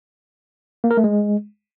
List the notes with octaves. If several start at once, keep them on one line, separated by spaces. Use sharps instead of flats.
A#3
A#4
A3
G#3